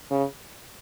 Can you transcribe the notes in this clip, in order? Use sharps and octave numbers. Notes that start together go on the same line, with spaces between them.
C#3